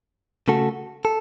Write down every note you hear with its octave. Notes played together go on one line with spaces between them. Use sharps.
C#3 A3 F#4 A4
A4